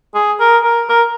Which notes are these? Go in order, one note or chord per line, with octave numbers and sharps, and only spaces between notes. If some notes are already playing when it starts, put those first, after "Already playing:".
G#4
A#4
A#4
A#4